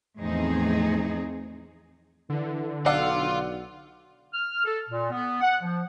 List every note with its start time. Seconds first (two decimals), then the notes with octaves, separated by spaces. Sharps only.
0.19 E2 A2 F3 C4 D#4 G#4
2.30 D3 E3
2.86 B1 F4 D5 F#5 E6
4.33 F6
4.65 A4
4.89 A#2
5.11 B3
5.41 F#5
5.61 F3